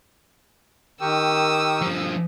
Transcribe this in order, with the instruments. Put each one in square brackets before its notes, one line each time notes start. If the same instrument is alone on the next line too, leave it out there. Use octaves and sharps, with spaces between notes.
[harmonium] D#3 G5 [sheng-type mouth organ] G4 A#4 C#6 [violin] D#6 E6
[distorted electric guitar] G2 F3